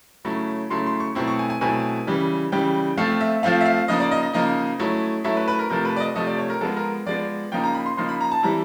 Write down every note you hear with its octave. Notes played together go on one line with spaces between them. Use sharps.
C#3 F#3 A3 C#4 E4
C#3 F#3 A3 C#4 E4 C6
C6
C#6
B2 F#3 A3 C4 E4
C#6
G#5
G#5
B2 F#3 A3 C4 E4 G#5
C#3 E3 G3
C#3 E3 G3 G5
F3 A3 C4 F4 F5
E5
F3 A3 C4 F4 F5
E5
F5
C#3 F3 A#3 D#4 D#5
D5
D#5
D#5
C#3 F3 A#3 D#4 D#5
F#3 A3 C#4 E4
F#3 A3 C#4 E4 E5
B4
B4
A#4
C3 F3 A3 A#4
B4
D5
D#5
C3 F3 A3 D#5
D5
C#5
A#4
F3 G#3 B3 A4
A#4
F3 G#3 B3 D5
C#3 F3 A#3 D#4 G5
A#5
B5
C6
C#3 F3 A#3 D#4 C6
B5
A#5
A5
E3 G3 C4 E4 A#5